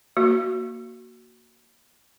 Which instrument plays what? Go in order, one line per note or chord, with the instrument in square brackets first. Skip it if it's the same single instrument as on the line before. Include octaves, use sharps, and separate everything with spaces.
[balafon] A#3 F#4